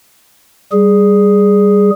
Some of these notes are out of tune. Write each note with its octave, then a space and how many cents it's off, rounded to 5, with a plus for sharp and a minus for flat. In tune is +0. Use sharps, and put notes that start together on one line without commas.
G3 +0 G#4 +0